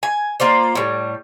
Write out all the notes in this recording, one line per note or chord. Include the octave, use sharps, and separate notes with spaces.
G#5
A#3 F4 C5 D5
A2 G3